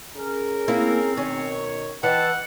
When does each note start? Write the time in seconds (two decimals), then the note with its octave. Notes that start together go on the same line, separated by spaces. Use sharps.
0.17 C#4 G#4 A#4
0.68 A#3 C4 E4
1.17 B2 D#3 C#4 C#5
2.03 E3 D#5 F#5 G5 A5